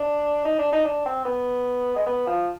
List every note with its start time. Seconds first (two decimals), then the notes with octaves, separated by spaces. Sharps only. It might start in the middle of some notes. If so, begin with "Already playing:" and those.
Already playing: D4
0.45 D#4
0.59 D4
0.72 D#4
0.85 D4
1.06 C4
1.25 B3
1.96 G#3
2.06 B3
2.27 F3